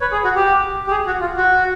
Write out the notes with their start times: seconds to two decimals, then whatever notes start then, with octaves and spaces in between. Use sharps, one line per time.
0.01 B4 C#5
0.12 G#4
0.24 F#4
0.36 G4
0.87 G4
0.91 G#4
1.06 F#4
1.21 F4
1.37 F#4